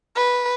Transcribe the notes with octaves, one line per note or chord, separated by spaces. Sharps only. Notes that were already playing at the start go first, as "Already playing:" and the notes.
B4